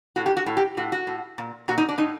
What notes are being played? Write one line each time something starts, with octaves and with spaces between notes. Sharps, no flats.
A2 F#4
G4
F#4
A2
G4
A2 F#4
F#4
A2
A#2
A#2 F#4
D#4
D4
A2 D#4